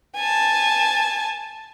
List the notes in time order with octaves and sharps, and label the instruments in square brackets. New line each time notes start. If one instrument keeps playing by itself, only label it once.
[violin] G#5 A5